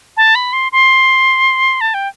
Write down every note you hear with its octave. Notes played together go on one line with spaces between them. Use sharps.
A5
B5
C6
C6
A5
G5